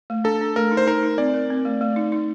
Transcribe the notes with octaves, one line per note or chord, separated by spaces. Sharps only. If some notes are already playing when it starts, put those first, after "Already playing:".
A3
D4 A4
D4
A3 A#4
D#4
C5
D#4 A#4
D#4
C4 D5
A#4
C4
A3
A3
D#4
D#4